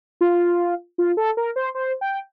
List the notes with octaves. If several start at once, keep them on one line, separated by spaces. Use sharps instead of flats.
F4
F4
A4
A#4
C5
C5
G5